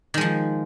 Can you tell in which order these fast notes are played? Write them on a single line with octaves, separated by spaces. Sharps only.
D#3 G#3 F3